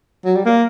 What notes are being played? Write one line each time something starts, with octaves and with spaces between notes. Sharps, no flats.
F#3
G3
A#3